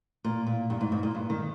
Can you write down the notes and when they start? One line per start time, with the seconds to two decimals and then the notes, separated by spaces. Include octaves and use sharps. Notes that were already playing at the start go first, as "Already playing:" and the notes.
0.25 A#2
0.47 A#2
0.70 G2
0.81 G#2
0.92 G#2
1.03 A#2
1.15 G2
1.30 D#3